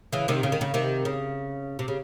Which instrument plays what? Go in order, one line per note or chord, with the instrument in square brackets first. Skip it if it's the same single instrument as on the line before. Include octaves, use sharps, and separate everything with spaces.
[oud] C#3 E3
C3 D#3
C#3
D#3
C#3
C3 D#3
C#3
C3
C#3